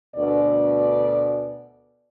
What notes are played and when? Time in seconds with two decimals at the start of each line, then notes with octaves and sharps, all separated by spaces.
0.16 D2 B2 D5